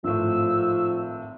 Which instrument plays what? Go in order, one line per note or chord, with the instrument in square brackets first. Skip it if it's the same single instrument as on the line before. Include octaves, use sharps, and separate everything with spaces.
[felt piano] G#1 A2 [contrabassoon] F3 [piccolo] E6